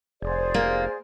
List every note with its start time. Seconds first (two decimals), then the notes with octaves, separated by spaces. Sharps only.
0.22 F1 G#4 C5 D5
0.54 A#3